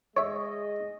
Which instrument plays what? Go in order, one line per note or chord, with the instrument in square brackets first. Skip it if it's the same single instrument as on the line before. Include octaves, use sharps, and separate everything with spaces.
[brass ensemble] G#3 D#5 [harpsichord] C#5 E5